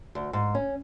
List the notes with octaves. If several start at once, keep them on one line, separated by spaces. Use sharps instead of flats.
D2
G#2
C#4